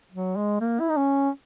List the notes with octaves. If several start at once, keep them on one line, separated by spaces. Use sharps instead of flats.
F#3
G#3
A#3
E4
D#4
C#4